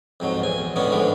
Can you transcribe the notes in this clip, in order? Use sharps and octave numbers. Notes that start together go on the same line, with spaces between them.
F2 G#2 F#3
E2 G#5
E2
A2 D3 G#3 B3 C#4
G#2 D3 E3 F3